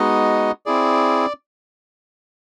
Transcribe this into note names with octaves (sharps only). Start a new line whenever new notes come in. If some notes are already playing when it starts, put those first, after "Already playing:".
Already playing: G#3 B3 D#4 F#4 D#5
C4 E4 G#4 D5